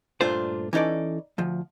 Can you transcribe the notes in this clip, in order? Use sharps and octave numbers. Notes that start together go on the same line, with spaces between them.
G2 A#2 A3 D4 F4 C5
E3 C#4 D#4 A4 D5
D2 F3